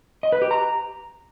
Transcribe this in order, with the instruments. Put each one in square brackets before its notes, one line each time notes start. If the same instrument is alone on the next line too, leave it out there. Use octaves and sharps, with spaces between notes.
[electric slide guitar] D#5
B4
G4
A#5